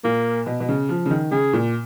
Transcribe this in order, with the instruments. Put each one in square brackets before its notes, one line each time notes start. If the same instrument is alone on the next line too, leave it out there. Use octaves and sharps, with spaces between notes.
[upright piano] A#2 [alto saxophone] A#3
[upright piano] B2
B2
C#3
F3
C#3
D#3
[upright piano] C#3 [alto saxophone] G#4
[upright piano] A#2